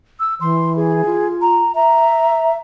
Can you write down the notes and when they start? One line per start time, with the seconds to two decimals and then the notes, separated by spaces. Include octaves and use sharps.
0.20 E6
0.41 E3 C6
0.76 G#4
1.05 F4
1.41 A#5
1.75 E5 A#5